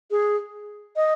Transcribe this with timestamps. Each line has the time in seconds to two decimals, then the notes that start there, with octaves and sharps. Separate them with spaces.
0.11 G#4
0.96 D#5